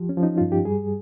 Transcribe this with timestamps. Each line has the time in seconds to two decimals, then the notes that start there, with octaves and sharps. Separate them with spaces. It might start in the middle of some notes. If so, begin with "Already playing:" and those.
Already playing: F3 G4
0.09 C#4
0.17 F3
0.23 D#4
0.38 G2 F4
0.52 G4
0.65 G3 G#4